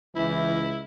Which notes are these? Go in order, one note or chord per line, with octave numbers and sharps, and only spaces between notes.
C#2 E3 E4